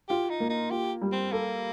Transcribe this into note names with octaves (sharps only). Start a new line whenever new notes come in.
F4 G4
D#4
A#3
D#4
F4 G4
G3
C4
A#3 A4